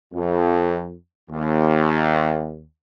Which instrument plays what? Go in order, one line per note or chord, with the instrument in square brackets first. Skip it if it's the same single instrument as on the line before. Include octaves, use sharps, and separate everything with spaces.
[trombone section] F2
D#2